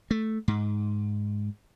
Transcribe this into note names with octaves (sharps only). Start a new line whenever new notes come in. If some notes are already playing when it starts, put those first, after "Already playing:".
A3
G#2